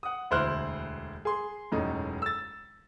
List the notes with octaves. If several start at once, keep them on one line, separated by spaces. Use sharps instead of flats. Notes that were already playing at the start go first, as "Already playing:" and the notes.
F#5 D#6
E1 D2 E4 C5 F6 F#6
G#4 C6
E1 F#2 A2 A3 D#4
E6 A6